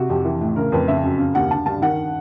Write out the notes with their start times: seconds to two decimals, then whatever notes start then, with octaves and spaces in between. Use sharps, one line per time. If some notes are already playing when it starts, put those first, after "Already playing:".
Already playing: C3 F#4
0.10 F2 G4
0.25 E3
0.41 A2
0.56 C#3 A#4
0.72 F2 B4
0.88 C#3 E5
1.04 F#2
1.19 C#3
1.35 D#2 F#5
1.51 D3 A5
1.66 G2 A5
1.82 D#3 F#5